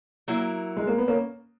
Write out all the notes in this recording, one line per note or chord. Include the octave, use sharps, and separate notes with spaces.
F#3 A#3 E4
G#3
A#3
B3
A#3 C#4